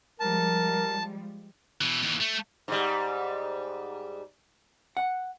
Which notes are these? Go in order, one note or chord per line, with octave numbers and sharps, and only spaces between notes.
F3 G3 G#3 A#4 A5
B2 E3
D#2 E3
A3
G#2 G3
F#5